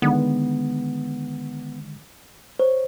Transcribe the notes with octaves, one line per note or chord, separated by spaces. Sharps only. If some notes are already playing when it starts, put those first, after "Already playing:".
D3 D#3 G#3 B3
C5 C#5